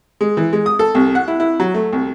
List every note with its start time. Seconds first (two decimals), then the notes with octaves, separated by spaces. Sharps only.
0.21 G#3
0.37 E3
0.53 G#3
0.66 D#6
0.79 A4
0.95 C2
1.15 F#5
1.28 E4
1.40 E4
1.60 F#3
1.74 A3
1.93 C2